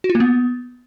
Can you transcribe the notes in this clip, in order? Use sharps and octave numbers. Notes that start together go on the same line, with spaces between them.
F#4
F4
A#3
B3